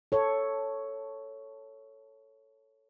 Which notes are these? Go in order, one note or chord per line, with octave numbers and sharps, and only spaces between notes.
A4 C#5